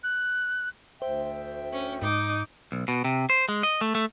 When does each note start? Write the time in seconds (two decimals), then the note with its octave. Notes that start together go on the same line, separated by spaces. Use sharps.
0.03 F#6
1.02 D2 C5 E5 G5
1.73 C#4
2.02 G#2 D#4 D6
2.72 B1
2.88 B2
3.04 C3
3.30 C5
3.49 G#3
3.63 D#5
3.81 A3
3.95 A3